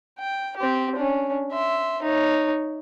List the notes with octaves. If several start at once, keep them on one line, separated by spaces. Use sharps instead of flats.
G5
C4 G4
C#4 D4
E5 C6
D#4 C#5